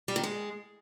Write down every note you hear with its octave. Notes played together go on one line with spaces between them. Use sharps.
G3
D#3
G#3